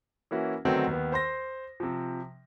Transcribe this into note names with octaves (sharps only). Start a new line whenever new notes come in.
E3 A#3 C#4 E4 F#4
D3 D#3 F#3 A3 B3 C4
D#2 B3
C5 C6 A#6
C3 F3